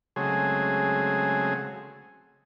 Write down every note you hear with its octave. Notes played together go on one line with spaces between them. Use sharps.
C#3 F#3 G#3 A3 C4 G#4